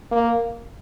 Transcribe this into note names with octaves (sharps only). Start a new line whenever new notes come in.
A#3